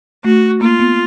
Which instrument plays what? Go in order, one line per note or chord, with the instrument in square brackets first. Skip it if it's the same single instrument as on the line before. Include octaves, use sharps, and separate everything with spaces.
[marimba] A3 [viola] F#4
[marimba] A#3 [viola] F4
[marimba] B3